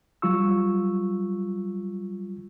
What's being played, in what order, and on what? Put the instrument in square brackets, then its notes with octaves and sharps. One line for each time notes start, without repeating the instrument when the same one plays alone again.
[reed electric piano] F#3 G3 F4 C#6 E6